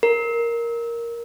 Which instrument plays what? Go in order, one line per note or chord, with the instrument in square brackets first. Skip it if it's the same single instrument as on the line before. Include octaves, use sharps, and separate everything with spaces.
[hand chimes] A#4